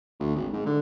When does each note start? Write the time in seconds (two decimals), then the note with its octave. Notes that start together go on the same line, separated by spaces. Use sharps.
0.20 D2
0.36 G#1
0.53 G#2
0.66 D3